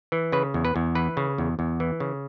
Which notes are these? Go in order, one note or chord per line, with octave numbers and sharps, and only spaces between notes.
E3
C#3 B4
E2
B4
E2
E3 B4
C#3
E2
E2
E3
C#3